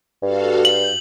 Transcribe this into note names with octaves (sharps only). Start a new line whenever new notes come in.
G2 F#4 A4 F5
G6 F#7